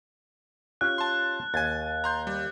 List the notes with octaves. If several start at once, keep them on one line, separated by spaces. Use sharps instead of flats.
C#4 F4 G4 F#6
A5 C6
D#2 G#5 G#6 A6
A#5 C6 G6
G3